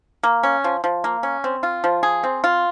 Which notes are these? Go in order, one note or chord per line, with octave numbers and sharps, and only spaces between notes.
A#3
C#4
F3
F3
A#3
C#4
C4
F4
F3
G#4
C4
F4